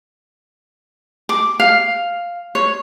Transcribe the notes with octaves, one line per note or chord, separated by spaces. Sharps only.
D6
F5
C#5